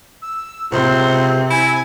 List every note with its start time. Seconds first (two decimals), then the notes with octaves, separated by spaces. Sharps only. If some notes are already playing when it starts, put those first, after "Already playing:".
0.21 E6
0.72 C#2 C3 C4 C5
1.51 E4 G#5